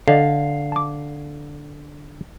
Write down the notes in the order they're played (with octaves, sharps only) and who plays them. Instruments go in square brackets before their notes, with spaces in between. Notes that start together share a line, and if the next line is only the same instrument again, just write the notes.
[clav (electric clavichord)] D3 [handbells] A4 D5 D#5 [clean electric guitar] F5
[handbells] A5 D6